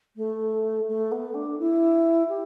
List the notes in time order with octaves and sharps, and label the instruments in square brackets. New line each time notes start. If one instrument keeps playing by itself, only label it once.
[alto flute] A3
A3
B3
D4
E4
G4